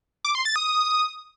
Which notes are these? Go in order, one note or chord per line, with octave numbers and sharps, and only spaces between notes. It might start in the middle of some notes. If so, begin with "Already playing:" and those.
D6
C6
A6
D#6